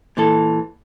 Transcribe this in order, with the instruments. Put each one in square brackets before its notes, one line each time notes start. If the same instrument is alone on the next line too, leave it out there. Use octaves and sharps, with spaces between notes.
[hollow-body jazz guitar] A#2 E3 A4